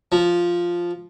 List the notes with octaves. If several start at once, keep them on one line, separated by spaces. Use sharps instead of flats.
F3